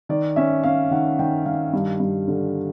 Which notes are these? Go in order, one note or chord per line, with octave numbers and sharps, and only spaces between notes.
D#3 D5
C#4 E5
C#4 F5
D#3 F#5
D#3 G5
D#3 F5
G2
G2
D3